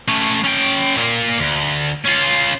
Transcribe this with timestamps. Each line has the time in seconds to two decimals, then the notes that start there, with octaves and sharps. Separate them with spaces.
0.08 A3 C#4
0.45 C#4 G5
0.96 A#2 A#3
1.39 D2
2.06 C#4 F4